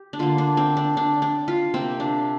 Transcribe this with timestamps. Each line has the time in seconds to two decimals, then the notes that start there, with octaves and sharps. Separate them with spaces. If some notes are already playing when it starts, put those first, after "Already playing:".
Already playing: G4
0.13 D4
0.19 D3 A#3 F4
0.38 D4
0.57 C4
0.77 D4
0.97 D4
1.22 D4
1.48 F4
1.74 C3 A#3 C4
2.00 D4